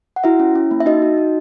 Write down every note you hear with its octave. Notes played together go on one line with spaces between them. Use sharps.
F#5
E4 F#4 E5
C#4
C#4
A#3
E5
D#4 F#4 D#5
F#4
F#4